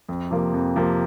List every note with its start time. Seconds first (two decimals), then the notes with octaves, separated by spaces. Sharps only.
0.09 F2
0.31 C3 F3 A#3
0.53 F2
0.76 C3 F3 A#3